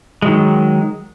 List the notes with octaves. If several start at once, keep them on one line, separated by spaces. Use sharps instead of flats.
D#3 F#3 G#3